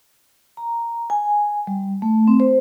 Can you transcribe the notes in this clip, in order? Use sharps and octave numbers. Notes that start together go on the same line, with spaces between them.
A#5
G#5
G3
A3
C4
C5